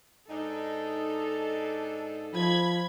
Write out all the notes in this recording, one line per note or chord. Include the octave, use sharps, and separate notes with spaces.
G#2 D4 D#4 A4
F3 B5 G#6